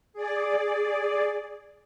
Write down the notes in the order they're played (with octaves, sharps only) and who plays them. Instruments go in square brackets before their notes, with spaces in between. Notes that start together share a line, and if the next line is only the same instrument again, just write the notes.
[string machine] G#4 D5